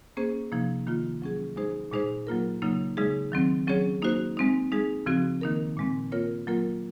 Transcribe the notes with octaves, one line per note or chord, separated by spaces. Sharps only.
A#3 C#4 G#4 C5
C3 F3 A#3 D#4
D#3 A#3 F4
F#3 C#4 G#4
G#3 D#4 G#4 C5
A#2 G#3 D#4 G#4 C5
F#3 A#3 F4 A#4
C#3 F#3 A#3 D#4
C#3 G#3 D#4 G#4
D#3 F#3 C4
F#3 C#4 G#4 C#5
A#3 D#4 F#4 C5
G#3 C4 D#4
G#3 D#4 G#4
C#3 F3 C4 F#4
D#3 A#3 D#4 A#4
A#2 G#3 C4
A#3 F4 A#4 C#5
F#3 A#3 F4 A#4